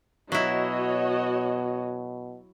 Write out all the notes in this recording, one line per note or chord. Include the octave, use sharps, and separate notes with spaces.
B2 F#3 E4 F#4 C#5 D#5